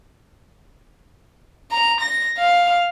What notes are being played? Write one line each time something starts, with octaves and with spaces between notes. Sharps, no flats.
A#5
A#6
F5